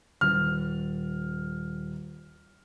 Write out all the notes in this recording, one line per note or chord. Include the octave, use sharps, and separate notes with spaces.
D#1 F6